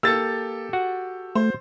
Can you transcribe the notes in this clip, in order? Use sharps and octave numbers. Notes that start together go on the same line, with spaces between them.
A#3 G4 A4 E6 A6
F#4 F#5
A3 C5